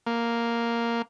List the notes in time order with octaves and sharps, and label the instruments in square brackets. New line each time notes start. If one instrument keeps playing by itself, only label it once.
[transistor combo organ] A#3